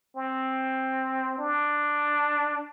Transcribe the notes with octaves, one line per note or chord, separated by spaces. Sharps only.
C4
D4